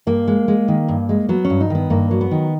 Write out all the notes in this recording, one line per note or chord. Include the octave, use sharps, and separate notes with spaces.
G2 A#3
G#3
G#3
D#3
G2
G#3
F#3 B3
C#4
G2
D#4
D#3 B3
G2 A#3
F#3
B3
D#3